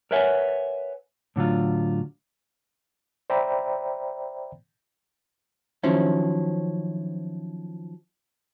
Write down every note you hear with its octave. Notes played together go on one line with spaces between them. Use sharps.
A#4 B4 C#5 E5 F#5 G#5
A2 D3 F#3 F4
C5 D5 E5 G5 A#5 B5
D#3 F3 F#3 C4 C#4 E4